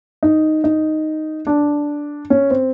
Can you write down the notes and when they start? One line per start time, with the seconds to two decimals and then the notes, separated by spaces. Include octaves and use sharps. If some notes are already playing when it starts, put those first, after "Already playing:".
0.23 D#4
0.64 D#4
1.47 D4
2.30 C#4
2.51 C4